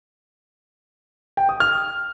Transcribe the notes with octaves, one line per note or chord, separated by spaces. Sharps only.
G5
D#6
F6